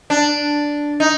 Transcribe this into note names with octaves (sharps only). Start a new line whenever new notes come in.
D4
D#4